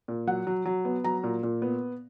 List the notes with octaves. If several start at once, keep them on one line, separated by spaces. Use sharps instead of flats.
A#2
F#3 F#5
F#3
F#3
B3
F#3 A#5
A#2
A#2
B3